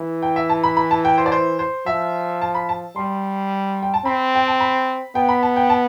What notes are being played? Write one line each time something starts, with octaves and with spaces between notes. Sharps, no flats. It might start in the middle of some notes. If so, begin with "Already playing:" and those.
Already playing: E3
G5
E5
A5
B5
B5
A5
G5
C5
D5
C5
C5
F3 E5
A5
B5
A5
G3 C6
G5
A5
C4 B5
G5
A5
B5
B3 G5
B5
A5
G5
A5